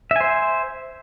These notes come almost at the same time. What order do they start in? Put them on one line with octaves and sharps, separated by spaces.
E5 G#5 C5